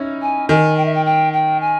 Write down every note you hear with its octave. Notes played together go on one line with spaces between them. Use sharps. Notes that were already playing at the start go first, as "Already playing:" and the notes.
Already playing: C#4 D#4 E4
G#5
D#3 G#5
G5
E5
G5
G5
G5
G#5